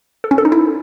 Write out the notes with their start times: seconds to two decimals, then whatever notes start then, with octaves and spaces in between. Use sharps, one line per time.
0.24 A4
0.31 C#4
0.38 A4
0.45 D#4
0.52 E4